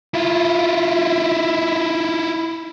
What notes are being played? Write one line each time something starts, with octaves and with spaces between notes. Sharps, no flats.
E4 F4